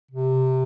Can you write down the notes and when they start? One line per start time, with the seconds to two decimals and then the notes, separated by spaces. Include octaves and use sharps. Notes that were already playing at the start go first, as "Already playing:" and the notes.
0.11 C3